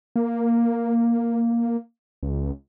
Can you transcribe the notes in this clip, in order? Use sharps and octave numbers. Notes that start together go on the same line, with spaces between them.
A#3
C#2